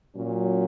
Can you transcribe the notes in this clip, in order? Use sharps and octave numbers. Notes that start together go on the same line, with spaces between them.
A#2 F#3 C#4